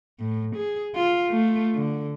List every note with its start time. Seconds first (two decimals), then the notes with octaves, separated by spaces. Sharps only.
0.20 A2
0.56 G#4
0.95 F4
1.30 A3 F4
1.75 D3